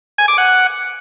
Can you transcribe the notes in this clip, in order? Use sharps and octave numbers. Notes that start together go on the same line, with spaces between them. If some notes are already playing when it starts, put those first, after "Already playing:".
G#5
D6
F#5